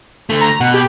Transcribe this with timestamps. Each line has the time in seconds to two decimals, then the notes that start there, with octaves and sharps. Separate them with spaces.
0.30 D3 A3
0.41 A#5
0.60 B2 F#5
0.74 G4